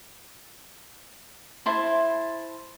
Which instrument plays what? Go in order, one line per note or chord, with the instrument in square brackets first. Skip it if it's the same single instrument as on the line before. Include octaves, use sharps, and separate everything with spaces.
[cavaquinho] E4 C5 A5